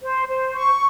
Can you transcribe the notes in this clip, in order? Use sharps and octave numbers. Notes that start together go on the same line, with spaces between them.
C5
C5
C#6